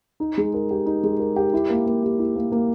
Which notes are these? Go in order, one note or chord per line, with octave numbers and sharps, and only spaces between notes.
D#4
G#3
A#4
G4
D#4
G#3
A#4
G4
E4
A#3
A#3
G4
E4
A#3
A#3